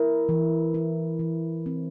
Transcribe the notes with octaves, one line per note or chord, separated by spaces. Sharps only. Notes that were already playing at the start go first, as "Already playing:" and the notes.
Already playing: E4 A#4
E3
E4
E3
C4